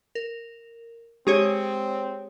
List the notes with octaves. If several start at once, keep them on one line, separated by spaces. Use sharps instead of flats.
A#4
G#3 C4 G4 G#4 C#5 D5